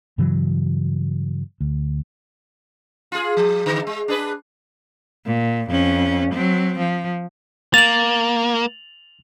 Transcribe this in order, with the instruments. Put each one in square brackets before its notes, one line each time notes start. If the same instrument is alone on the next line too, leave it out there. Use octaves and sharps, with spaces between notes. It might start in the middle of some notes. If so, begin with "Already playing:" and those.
[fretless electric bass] G2 C#3 E3 F#3
D2
[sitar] F4 G#4
F3
D3
G#3
D4 G#4 B4
[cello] A#2
F2 C#4
F#3 C4
F3
[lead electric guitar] A#3 [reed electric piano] A6 [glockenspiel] F7 F#7